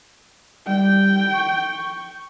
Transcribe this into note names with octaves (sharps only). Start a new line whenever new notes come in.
G3 G5
C#6